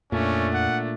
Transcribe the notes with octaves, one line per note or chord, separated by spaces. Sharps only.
F2 A#2 A3 C#4 D4
F#5